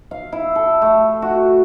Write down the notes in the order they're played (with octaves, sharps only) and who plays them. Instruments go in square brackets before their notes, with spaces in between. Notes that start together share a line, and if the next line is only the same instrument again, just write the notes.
[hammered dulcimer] F5
E4
A4
A3
F#4